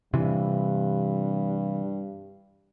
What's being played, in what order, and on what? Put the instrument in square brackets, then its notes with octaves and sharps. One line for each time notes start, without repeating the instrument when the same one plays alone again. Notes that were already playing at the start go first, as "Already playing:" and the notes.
[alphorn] G2 [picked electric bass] C3 E3